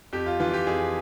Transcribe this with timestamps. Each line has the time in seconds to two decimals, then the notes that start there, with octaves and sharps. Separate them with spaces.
0.13 F2 G4
0.26 F4
0.40 E3 F4
0.53 G4
0.67 F2 G#4